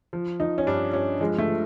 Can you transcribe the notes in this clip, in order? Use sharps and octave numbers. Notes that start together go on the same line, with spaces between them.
F3
F3 D#4
C#4
G2 D4
G2 C#4
F3 G#3
A3
F3